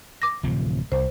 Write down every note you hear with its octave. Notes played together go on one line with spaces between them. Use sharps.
D6 A#6
D1 C3 F3
C2 C5